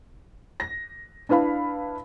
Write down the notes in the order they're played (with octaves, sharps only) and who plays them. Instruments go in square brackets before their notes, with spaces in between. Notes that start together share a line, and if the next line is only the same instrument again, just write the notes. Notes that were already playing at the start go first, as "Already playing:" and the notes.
[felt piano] A#6
D4 E4 B4 F5 B5